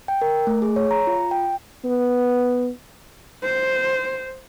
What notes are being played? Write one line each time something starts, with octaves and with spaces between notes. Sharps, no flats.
G5
A#4
A3
G#4
C#5
A#5
F4
G5
B3
C5